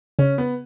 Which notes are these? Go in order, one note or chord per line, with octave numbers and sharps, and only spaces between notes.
C#3 C#4
B3